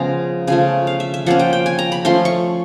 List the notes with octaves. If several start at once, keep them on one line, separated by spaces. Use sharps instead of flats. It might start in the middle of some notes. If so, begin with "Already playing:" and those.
Already playing: C#3 F3 G#3 B3 A#5
C#3 F3 A3 G#5
F5
E5
E5
F3 A#3 C#4 F#5
G5
G5
G#5
A#5
B5
F3 A3 C#4 C6
C#6